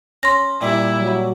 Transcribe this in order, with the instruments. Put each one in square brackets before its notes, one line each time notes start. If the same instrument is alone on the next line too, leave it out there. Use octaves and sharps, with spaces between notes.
[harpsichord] C#4 [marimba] C6 A#6
[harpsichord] A#2 G3 [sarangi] E4
[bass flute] F#3